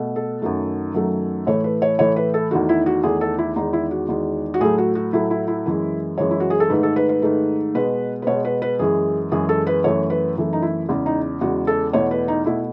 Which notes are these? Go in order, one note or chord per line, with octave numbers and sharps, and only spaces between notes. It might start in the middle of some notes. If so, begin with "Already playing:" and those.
Already playing: B2 A3
A4
F#2 D#3 F#3 A3
F#2 D#3 F#3 A3
A2 E3 A3 C#5
B4
C#5
A2 E3 A3 C#5
B4
A4
E2 D#3 A3 F#4
E4
F#4
E2 D#3 A3 G#4
A4
E4
E2 D#3 G#3 D#4
E4
F#4
E2 D#3 G#3
F#4
A2 F#3 A3 G#4
F#4
F#4
A2 F#3 A3 E4
E4
E4
F#2 E3 G#3
F#2 E3 G#3 C#5
E4
F#4
G#4
A4
G#2 D#3 A3 B4
A4
B4
B4
G#2 D#3 A3
B2 G#3 B4
B4
B2 G#3 C#5
B4
B4
F#2 E3 G#3 G#4
F#2 E3 G#3 G#4
A4
B4
F#2 E3 A3 C#5
B4
F#2 E3 A3
D#4
E4
E2 C#3 G#3
D#4
E2 C#3 G#3 F#4
A4
E2 B2 A3 C#5
B4
D#4
B2 A3 E4